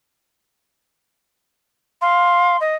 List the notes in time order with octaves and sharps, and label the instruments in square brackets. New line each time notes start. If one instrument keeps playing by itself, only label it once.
[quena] F5 [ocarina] C6
[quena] D#5